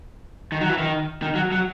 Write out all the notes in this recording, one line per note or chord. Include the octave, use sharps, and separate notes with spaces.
D#3
F#3
E3
D#3
D#3
F#3
F#3